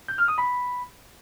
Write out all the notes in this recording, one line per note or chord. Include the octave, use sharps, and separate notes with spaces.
G6
F6
D#6
B5